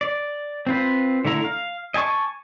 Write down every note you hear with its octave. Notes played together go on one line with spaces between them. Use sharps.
D5
C4 F4 B4
D3 A3 E4 A#5
F5
D#5 G#5 A5 C#6 D6